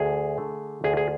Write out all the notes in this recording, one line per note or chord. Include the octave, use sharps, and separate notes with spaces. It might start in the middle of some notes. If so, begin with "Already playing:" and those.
Already playing: D2 G#4
D3 A3
D2 G#4
G#4